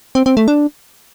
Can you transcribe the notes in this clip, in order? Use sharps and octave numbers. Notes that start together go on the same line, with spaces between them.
C4
C4
A3
D4